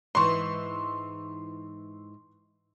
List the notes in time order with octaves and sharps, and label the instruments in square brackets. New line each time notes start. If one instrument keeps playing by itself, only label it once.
[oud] G#2 E3 [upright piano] C6 C#6